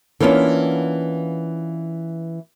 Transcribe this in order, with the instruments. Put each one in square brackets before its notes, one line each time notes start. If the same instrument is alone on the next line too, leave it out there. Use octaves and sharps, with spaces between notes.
[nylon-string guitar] E3 A#3 B3 C#4 D4 F4